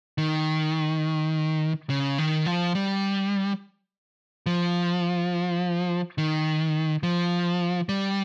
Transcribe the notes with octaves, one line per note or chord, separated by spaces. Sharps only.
D#3
C#3
D#3
F3
G3
F3
D#3
F3
G3